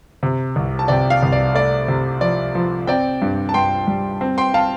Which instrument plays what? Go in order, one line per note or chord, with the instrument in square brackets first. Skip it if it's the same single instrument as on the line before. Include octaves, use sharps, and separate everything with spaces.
[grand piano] C3
C2
A5
C3 D5 G5
F5
C2
D5
A3 D5
C3
F3 D5
F3
C4 D5 G5
G2
A5
G2 G5 C6
G3
C4
G5 C6
F5 A5